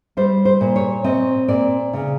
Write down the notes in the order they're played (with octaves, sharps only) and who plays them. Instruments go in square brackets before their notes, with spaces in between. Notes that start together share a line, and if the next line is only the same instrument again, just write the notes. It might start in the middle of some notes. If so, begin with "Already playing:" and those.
[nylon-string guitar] G3 C5
C5
A#2
C#5
C4 D#5
A#2 D5
C#3